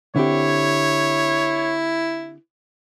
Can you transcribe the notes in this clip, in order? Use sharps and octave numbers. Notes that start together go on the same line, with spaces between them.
D3 C4 E4 G4 C#5